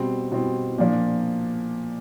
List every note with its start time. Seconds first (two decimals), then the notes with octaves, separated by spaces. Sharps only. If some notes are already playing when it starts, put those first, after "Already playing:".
Already playing: B2 G3 C4
0.32 B2 G3 C4
0.78 A#2 F3 A#3 D4